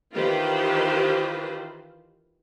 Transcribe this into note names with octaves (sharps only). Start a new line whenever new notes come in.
D#3 E3 F4 G4 B4 C5